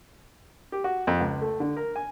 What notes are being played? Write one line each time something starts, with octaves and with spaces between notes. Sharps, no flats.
G4
F#4
F2
C#2
A3
D3
A#4
G#5